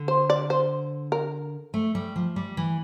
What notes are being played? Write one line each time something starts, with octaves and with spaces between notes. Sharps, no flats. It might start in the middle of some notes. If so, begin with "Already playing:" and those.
Already playing: D3
C5
D5
C5
A#4
A3
G3
F3
G3
E3